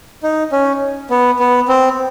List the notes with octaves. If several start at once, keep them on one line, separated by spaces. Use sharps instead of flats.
D#4
C#4
B3
B3
C4